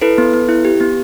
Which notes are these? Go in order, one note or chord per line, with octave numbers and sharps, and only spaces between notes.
E4 A4 B4
B3
B3
E4
G4
B3